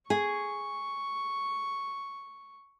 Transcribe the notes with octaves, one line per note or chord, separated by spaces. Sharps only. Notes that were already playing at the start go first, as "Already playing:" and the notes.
G#4 C#6